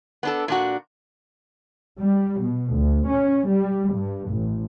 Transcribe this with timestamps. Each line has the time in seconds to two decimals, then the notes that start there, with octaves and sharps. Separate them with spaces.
0.23 B3 D4 A4
0.48 A#2 D4 F#4
2.01 G3
2.41 B2
2.74 D2
3.08 C#4
3.48 G3
3.94 G2
4.30 A1